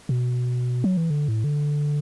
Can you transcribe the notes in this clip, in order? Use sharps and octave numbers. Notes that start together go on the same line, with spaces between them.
B2
F#3
E3
D3
A2
D3